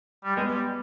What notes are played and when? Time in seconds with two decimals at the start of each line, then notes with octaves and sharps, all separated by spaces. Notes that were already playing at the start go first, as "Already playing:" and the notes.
0.24 G3
0.36 G#3 B3
0.55 G3